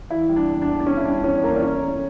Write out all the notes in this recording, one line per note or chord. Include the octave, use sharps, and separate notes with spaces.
E3 E4
G3
D4
E2
D4
E2
D4
E3 C#4
E4
G3 D4
E2 C#4 C#5
E2 A#3 A#4
D5
E3 C#4 C#5
A3